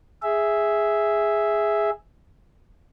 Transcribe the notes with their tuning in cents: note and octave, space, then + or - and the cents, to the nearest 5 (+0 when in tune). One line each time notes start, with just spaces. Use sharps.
G#4 +0 E5 +0